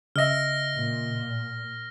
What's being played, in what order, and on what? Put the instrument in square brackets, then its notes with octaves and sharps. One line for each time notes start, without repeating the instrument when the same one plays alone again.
[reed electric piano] C#3 D#5 E5 [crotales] F6 A#6
[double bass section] A#2